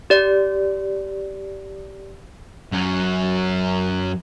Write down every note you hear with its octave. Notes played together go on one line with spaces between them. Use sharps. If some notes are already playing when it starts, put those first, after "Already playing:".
G4 D5
F#2 F#3